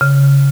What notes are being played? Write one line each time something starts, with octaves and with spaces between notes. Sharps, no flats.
C#3